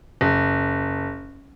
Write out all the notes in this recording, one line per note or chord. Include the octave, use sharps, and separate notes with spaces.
F#1